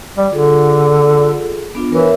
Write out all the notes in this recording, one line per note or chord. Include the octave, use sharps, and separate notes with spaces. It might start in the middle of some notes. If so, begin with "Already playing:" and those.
G3
D3 F4 G#4 A4
B3 D4 F4
E3 A#4 C#5 E5